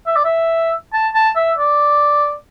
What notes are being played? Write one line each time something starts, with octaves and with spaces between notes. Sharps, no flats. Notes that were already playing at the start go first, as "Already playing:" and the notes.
E5
D5
E5
A5
A5
E5
D5